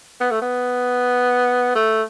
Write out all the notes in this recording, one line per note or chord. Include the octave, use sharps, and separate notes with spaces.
B3
A3
B3
A3